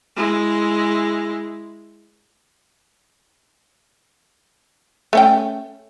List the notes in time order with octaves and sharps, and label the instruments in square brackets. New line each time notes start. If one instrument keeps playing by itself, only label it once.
[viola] G#3 E4
[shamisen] A3 C#4 G5